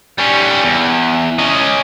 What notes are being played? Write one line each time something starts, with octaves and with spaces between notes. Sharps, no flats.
G3 C#4
E2
C#4 D#5